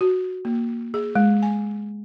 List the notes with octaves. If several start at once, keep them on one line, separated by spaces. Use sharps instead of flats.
F#4
A#3
G#4
G#3
G#5